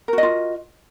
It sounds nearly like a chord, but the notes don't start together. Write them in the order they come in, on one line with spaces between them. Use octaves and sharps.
A#4 F#4 D#5 F4